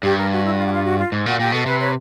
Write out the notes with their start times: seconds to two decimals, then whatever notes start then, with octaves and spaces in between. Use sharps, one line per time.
0.03 G2 G4
0.17 A#4
0.31 F#4
0.44 E4
0.53 F#4
0.57 F4
0.65 F#4
0.72 F4
0.85 F#4
0.98 F4
1.12 G#2
1.26 A#2 F#4
1.39 A#2 G4
1.52 B2 A4
1.66 C3 B4
1.79 B4 C#5